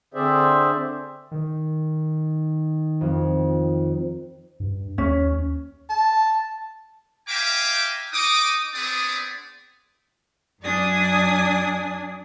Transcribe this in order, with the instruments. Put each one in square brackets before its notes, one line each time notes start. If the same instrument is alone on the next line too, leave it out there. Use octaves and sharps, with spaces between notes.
[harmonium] D3 C4 G#4 C5 D5 E5
[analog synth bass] D#3
[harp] F2
[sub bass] G2
[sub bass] D#2 [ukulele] C#4
[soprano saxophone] A5
[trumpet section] E5 F5 G5 G#5 A#5 D6
D#4 D6 D#6
B3 C4 D4 G#4 D5 D#6
[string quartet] F#2 D4 D5 G#5 D#6